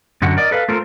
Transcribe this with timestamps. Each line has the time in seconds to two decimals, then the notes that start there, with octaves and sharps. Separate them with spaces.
0.22 F#2 D3 F#4 F#5
0.37 A#4 D5 D#5
0.51 A4 B4 D#5 F5
0.69 A3 F4 A4 A#4 C5